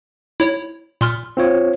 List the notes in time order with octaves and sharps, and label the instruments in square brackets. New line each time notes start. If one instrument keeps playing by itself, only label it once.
[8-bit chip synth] E4 C#5
A#2 C6 F6
[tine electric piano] C4 F4 C#5